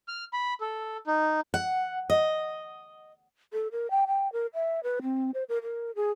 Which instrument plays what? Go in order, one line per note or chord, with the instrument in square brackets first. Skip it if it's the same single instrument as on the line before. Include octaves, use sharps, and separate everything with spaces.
[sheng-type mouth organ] F6
B5
A4
D#4
[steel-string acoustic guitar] F#5
D#5
[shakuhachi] A4
A#4
G5
G5
A#4
E5
B4
C4
C5
A#4
A#4
G#4